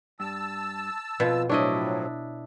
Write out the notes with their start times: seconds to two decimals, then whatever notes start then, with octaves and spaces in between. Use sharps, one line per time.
0.20 G2 A5 E6
1.20 F2 B2 F3 F4
1.50 A2 F3 F#3 D4 E4 C#5 D#5